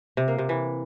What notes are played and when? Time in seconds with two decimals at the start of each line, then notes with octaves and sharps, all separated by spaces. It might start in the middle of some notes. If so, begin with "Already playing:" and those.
0.17 C3
0.28 A#3
0.38 C3
0.49 E3